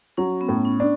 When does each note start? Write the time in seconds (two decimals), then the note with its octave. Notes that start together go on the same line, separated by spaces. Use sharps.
0.17 F#3 C#4
0.41 B3
0.49 A2
0.65 C#4
0.80 D4